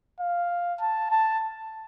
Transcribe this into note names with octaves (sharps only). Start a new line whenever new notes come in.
F5
A5
A5